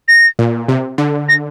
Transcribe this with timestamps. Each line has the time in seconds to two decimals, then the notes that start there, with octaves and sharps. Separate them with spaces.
0.08 A#6
0.39 A#2
0.68 C3
0.98 D3
1.29 A#6